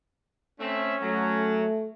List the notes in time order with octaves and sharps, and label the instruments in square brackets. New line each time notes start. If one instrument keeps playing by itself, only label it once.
[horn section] A3 C4 E5 [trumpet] C#4
[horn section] F#3 [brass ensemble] A3